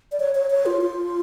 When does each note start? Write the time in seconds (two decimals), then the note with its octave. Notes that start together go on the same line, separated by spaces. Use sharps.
0.12 D5
0.20 C#5
0.35 C#5
0.50 C#5
0.66 F4
0.82 F4